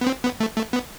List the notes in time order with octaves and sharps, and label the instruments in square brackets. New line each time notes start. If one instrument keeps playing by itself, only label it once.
[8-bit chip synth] B3
C4
B3
A3
A3
B3